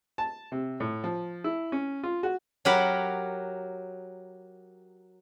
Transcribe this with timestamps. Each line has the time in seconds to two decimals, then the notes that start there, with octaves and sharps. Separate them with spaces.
0.18 A5
0.52 C3
0.80 A2
1.04 F3
1.44 E4
1.72 C#4
2.03 F4
2.23 F#4
2.65 F#3 G4 A#4 F#5 B5